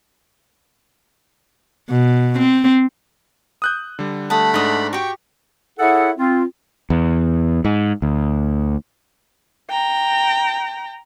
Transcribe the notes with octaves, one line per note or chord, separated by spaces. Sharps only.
B2
C4
D#6 F#6 G6
D3 G3
A3 F#5 A5 B5 D#6
G#2 D4 D#4 D#6
F#4 G4 G5 C#6
E4 G#4 A4 C#5 E5 F#5
C4 F4
E2
G#2
D2
G5 A#5